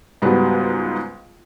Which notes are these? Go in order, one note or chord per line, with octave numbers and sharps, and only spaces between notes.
C#2 G#2 F#3 G3 B3